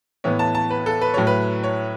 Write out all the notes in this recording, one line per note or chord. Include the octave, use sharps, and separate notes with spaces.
A2 E3 B3 C#5
A5
A5
B4
A4
B4
A2 F#3 A3 C#5
B4
C#5